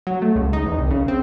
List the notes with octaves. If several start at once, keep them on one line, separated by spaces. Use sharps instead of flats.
F#3
A3
C#2
D#4
E2
C2
C#3
C4